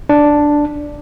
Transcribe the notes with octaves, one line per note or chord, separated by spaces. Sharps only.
D4